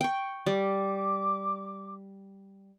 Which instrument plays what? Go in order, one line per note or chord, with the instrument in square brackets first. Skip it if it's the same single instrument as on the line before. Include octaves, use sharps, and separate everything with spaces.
[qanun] G5 C#6
[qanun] G3 [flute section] D6